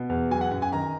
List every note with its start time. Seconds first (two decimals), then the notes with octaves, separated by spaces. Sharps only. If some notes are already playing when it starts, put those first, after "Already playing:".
Already playing: B2
0.09 E2
0.31 F#3 G#5
0.41 F#5
0.51 F#2 F#5
0.62 G#5
0.72 D#3 A#5